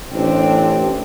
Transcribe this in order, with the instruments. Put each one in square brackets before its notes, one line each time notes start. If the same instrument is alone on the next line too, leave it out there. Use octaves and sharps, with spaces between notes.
[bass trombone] A1 [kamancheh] C4 D4